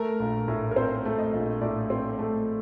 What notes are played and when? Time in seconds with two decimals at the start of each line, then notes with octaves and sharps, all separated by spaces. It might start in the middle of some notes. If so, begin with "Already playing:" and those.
Already playing: A3 A#4
0.19 A#1
0.48 A2
0.71 A#4
0.76 C4 C5
1.05 A3
1.19 D#5
1.33 A#1
1.61 A2 D5
1.90 C4
2.19 A3